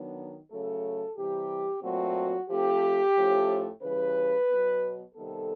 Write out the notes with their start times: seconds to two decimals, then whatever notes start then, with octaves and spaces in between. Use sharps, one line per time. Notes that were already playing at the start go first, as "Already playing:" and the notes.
Already playing: D#3 F#3 B3 D4
0.51 C#3 F#3 A3 A4
1.17 C3 E3 G3 G4
1.83 A#2 F#3 A3 C4 F#4
2.49 F3 A3 C4 G4
3.16 A2 F3 A3 C#4
3.82 C#3 E3 G3 B4
4.48 B2 F#3 B3
5.15 C3 D#3 G3 B3 A4